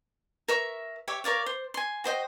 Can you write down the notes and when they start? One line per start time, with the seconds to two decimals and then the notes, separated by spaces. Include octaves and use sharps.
0.48 A#4 E5 C#6
1.08 G4 C#5 E5 D6
1.24 A#4 C#5 D5 F5
1.46 C5
1.74 G#5 C6
2.04 F#4 C5 D#5 G5